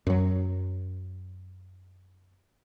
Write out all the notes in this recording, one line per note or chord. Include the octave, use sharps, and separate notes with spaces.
F#2 F#3